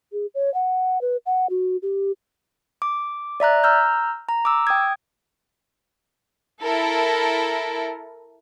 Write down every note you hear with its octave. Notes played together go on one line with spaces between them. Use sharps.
G#4
C#5
F#5
B4
F#5
F#4
G4
D6
D5 E5 A#5 F#6
A#5 E6 F6 G6
A#5
D6 E6
G5 D#6 G#6
E4 A4 A#4